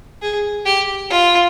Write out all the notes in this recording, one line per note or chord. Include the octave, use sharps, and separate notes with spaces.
G#4
G4
F4